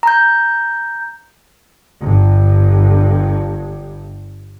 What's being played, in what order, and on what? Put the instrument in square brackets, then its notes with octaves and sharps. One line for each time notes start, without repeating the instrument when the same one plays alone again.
[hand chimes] A#5 G6
[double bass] G1 G2